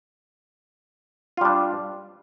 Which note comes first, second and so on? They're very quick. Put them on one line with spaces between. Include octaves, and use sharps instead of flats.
F4 G3 D4